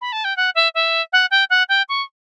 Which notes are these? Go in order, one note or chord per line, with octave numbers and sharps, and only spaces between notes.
B5
A5
G5
F#5
E5
E5
F#5
G5
F#5
G5
C#6